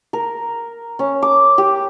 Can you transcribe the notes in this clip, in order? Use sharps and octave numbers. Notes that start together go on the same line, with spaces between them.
A#4
C#4
D6
G4